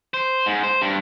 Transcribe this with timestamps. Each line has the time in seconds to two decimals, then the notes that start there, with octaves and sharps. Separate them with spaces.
0.14 C5
0.46 G#2
0.64 C5
0.82 G2